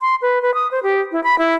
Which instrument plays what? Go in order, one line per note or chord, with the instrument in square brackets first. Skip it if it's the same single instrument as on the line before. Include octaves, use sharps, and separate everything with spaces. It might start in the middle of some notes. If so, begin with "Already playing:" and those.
[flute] C6
B4
B4
D#6
C5
G4
E4
B5
E4